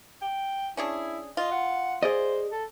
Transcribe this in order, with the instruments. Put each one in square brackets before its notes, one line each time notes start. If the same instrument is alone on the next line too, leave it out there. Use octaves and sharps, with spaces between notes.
[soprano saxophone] G5
[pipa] C#4 D4 G#4 [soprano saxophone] E4
[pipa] F4 [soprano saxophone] D#5
[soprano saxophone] F#5
[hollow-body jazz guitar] G#4 D5 D#5 [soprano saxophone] C5
[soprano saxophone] A4